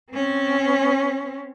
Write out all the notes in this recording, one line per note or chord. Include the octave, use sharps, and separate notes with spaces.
C4 C#4